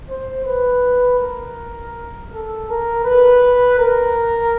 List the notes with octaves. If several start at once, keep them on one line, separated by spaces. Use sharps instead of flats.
C5
B4
A#4
A4
A#4
B4
A#4